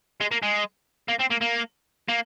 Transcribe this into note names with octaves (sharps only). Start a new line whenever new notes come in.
G#3
A#3
G#3
A#3
C4
A#3
A#3
A#3